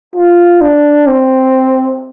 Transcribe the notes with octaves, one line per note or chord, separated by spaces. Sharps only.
F4
D4
C4